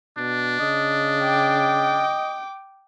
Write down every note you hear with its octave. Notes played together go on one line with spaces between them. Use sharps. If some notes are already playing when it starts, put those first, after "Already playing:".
B2 D4
C#3 D#5
G5 D6